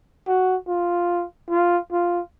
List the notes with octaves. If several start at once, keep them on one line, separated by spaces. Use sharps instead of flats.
F#4
F4
F4
F4